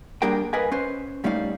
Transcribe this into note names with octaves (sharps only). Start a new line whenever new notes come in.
G3 A#3 D4 G#4 A#4 G5
A#4 B4 D#5 F5 G#5
C#4 B4 C5
A#2 G3 A3 C#4 D#4 F5